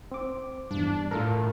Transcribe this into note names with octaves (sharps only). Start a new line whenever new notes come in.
C4 D6
E2 G2 D4
A2 F4 A4 A#4